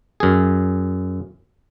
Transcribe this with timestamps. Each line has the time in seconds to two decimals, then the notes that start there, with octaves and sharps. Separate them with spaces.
0.20 F#2 G#4